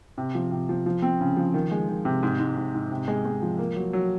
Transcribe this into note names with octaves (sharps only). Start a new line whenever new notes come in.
C3
F3
C3
F3
F3
C4
C#3
F3
D#3
G#3
D#3
C3
G#2
G#2
G#2
G#2
C3
G#3
G#3
F3
A#3
F#3
F#3